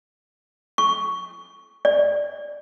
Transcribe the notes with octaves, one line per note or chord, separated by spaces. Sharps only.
C#6
D5